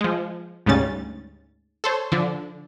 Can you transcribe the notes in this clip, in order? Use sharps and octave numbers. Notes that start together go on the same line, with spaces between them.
F3 G#3
D2 G#2 C#3 G3 C#4 A6
A4 C5 C#5
D3 F3 D4